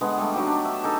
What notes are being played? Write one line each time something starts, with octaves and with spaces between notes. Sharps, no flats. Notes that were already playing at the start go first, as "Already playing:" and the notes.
D3 G#3 B3
G3 A3
F#3 D#4 G4
D4
E5
D#4 G#4 A4